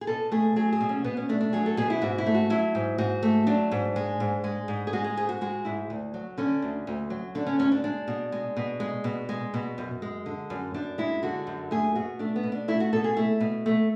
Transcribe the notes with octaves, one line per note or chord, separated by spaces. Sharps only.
G#4
B2 A4
A3 G#4
F#3 G#4
G#4
B2
C#4
B2 B3
C#4
A3 D4
D4
F#3 G#4
A4
B2 G#4
E4
G#2 F#4
E4
A3
F#4
F#3 E4
G#2
G#2 F#4
A3
F#3 D4
G#2
G#3
G#2
G#3
G#2
G#4
G#3 F#4
G#4
G#2 G#4
F#4
G#3 F#4
G#2 E4
D2
F#3
D3 C#4
D2
D2
F#3
D3 D4
C#4
D2 C#4
D4
G#3 D4
B2
G#3
B2
G#3
B2
G#3
B2
F#2
G#3
D3
F#2
F#2 D4
G#3 E4
D3 F#4
F#2
A3 G#4
B2 F#4
A3 D4
B3
B2
D4
A3 E4
F#4
B2 A4
G#4
A3 E4
B2
A3